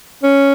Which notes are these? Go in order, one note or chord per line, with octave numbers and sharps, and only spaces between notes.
C#4